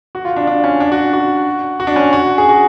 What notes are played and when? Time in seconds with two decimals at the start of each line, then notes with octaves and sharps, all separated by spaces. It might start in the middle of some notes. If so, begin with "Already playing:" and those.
0.15 F#4
0.25 F4
0.36 D4
0.47 D4
0.64 C#4
0.80 D4
0.92 F#4
1.13 F#4
1.80 F#4
1.87 D4
1.96 C#4
2.13 F#4
2.38 G#4
2.49 F#4